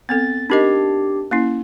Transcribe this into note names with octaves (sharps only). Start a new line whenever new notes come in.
B3 C4 A4 A6
D4 D#4 G4 A#4 D#5
A#3 C#4 E4